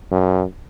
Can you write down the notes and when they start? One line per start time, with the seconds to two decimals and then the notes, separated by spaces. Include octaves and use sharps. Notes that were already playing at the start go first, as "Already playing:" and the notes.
0.11 F#2